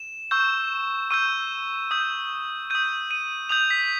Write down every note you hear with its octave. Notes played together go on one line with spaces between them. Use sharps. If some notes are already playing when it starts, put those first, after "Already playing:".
Already playing: E7
C#6 E6 G6
C#6 E6 G6 D#7
D#6 G6
D#6 G6 D#7
D#7
D#6 G6 F7
B6